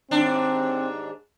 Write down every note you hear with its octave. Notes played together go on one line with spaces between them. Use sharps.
D#2 G#2 C4 D4